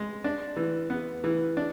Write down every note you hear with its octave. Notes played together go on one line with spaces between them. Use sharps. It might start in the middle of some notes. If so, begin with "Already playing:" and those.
Already playing: G#3
D4
E3
B3
E3
D4